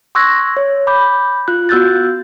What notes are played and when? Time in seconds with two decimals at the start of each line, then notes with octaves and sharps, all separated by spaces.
0.15 C6 C#6 E6 F#6 G#6 A#6
0.57 C#5
0.87 B5 D6 G6
1.48 F4 F#6
1.69 B3 F#4 E6 F#6 G6 A6